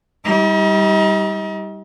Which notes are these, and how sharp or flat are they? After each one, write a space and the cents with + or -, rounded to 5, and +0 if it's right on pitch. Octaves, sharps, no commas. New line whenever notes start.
G3 +0 D#4 +40